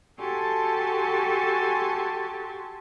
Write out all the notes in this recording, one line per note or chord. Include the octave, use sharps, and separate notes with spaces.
F#4 G4 A4 G#5 A5 C6